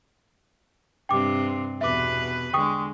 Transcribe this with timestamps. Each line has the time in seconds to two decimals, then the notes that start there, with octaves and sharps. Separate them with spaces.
1.09 G2 C3 C4 G5 D6
1.81 E2 B2 B4 E5 D6
2.53 D3 G#3 G5 C#6 D#6